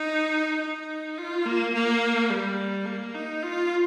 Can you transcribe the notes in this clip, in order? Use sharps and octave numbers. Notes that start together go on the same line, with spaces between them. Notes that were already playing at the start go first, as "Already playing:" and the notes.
Already playing: D#4
D#4
F4
A#3
A#3
G3
A#3
D#4
F4